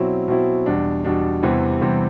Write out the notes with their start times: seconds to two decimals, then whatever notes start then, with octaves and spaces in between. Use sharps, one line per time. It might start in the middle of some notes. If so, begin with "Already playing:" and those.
Already playing: B2 F#3 C4 E4
0.28 B2 F#3 C4 E4
0.66 E2 B2 G3 D4
1.04 E2 B2 G3 D4
1.42 E2 C3 E3 G3 C4
1.81 E2 C3 E3 G3 C4